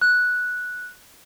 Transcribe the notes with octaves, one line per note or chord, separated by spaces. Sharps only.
F#6